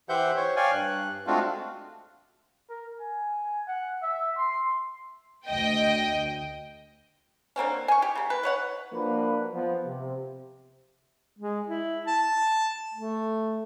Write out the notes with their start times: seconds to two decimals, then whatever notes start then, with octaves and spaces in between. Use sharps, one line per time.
0.09 E3 G4 C5 E5 F#5 G6
0.36 C5 C#5
0.56 C#5 D5 F5 G5 G#5
0.72 G2 F#6
1.27 G#3 A3 C4 D4 F4 F#4
2.70 A#4
3.00 G#5
3.68 F#5
4.02 E5
4.37 C6
5.46 D2 D#5 G5
7.56 D3 A#3 C4 C#4
7.88 G#5 C#6
8.02 G4
8.15 C#3 A#3
8.30 B4
8.43 B4 C#5 F#5
8.93 F3 A#3 D4 F#4 B4
9.54 F3 B3
9.86 C3
11.39 G#3
11.68 E4
12.07 A5
12.94 A3